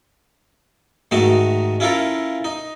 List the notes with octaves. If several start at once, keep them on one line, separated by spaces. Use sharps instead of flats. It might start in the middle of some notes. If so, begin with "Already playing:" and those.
G#2 D#3 A3 D#4 F#4
C#4 E4 F4 A4 A#4
D#4